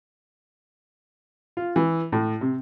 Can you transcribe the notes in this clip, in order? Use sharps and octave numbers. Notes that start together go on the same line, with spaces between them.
F4
E3
A2
C3